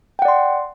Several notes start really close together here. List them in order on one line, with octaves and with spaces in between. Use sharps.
G5 F#5 D5 C6